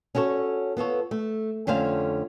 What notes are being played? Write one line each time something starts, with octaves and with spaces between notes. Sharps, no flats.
C#4 E4 F#4 A4 C#5
B3 F4 A4 C#5
A3
F2 D3 A3 C#4 C5 F5